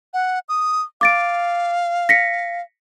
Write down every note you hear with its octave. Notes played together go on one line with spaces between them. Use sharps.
F#5
D#6
F5 D6 A6 D7
A#6 B6 C#7